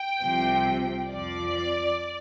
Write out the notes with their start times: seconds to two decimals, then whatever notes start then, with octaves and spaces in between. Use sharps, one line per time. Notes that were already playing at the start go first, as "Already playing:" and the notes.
Already playing: G5
0.21 C2 C3 F3
1.09 F2 F3 D5